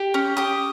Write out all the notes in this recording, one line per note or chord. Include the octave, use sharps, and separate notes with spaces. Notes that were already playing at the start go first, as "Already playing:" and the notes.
Already playing: G4
C#4
G4 D#6